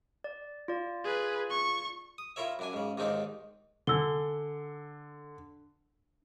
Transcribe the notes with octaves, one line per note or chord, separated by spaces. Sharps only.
D5
F4 D5
G#4 B4
C#6
D#6
E4 F4 A#4 C#5 E5
F#2 D4 G#5
G#2 C#3
D#2 G#2 D#3 C4 D4 D#4
D3 D4 E6 G7